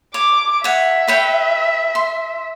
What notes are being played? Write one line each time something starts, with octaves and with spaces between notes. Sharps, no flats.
C#5 D6
C#5 E5 F#5
B4 C#5 G5
C6